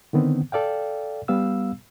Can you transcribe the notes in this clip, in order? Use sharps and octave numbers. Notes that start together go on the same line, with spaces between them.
D3 D#3 B3 C4
A4 D5 F5 G5
G3 B3 F5 E6